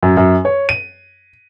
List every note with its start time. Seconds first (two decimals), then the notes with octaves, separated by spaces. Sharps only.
0.03 F#2
0.17 F#2
0.45 C#5
0.69 D#7